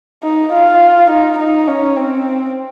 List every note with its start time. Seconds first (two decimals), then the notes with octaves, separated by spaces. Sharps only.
0.23 D#4
0.53 F4
1.10 D#4
1.39 D#4
1.67 C#4
1.96 C4